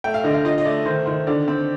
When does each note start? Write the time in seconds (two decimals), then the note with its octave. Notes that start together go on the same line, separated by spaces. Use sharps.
0.04 A3 G5
0.14 F5
0.24 D3 D#5
0.34 F5
0.45 F4 D#5
0.58 D#5
0.65 A3 D5
0.86 D#3 C5
1.06 D#3 C5
1.27 D3 D5
1.48 C4